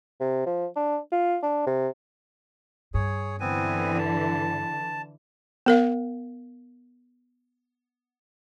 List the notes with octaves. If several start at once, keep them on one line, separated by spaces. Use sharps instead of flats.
C3
F3
D4
F4
D4
C3
G2 G#4 C#5
D3 E3 B3 C4 G#5
A5
B3 A#4 F5